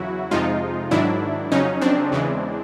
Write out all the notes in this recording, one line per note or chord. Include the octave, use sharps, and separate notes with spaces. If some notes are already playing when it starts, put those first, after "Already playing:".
Already playing: E2 C#3 F#3 E4 F#4
F2 C3 F3 G#3 D#4 F4
G#2 D#3 F#3 D4 E4
F2 C#3 F#3 C#4 D#4
C4 D4
E2 C#3 E3 G#3